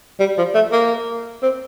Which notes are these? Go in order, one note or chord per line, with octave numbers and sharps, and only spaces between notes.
G3
F3
A3
A#3
C4